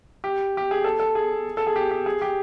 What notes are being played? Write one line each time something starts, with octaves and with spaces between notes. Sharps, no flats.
G4
G4
G#4
A4
A4
G#4
A4
G#4
G4
G4
G#4
G4